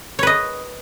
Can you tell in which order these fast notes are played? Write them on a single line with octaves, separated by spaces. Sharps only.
C#5 B4 D#5